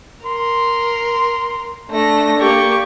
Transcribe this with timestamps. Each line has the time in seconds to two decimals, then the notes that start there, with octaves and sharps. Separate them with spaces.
0.26 A#4 C6
1.91 A3 D4 A4 A#6
2.40 A#3 G4 D5 C#6